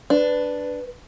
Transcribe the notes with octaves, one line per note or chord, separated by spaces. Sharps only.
D4 B4